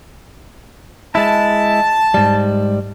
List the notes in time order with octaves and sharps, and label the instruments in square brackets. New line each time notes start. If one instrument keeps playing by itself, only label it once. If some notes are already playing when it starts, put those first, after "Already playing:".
[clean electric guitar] G#3 E4 [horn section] A5
[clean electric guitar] G#2 G3